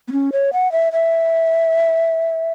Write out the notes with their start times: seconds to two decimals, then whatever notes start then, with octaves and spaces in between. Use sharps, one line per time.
0.08 B3
0.12 C#4
0.32 C#5
0.53 F#5
0.72 E5
0.93 E5